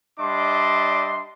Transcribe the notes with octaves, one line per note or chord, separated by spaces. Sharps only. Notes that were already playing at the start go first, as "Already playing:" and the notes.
G3 D4 D#5 E5 C6 D6